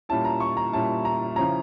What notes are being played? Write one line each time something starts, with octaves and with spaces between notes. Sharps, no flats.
A#2 G3 C#4 E4 A5
A#5
C#6
A#5
A#2 G3 C#4 E4 A5
A#5
C#3 F3 C#4 E4 A#5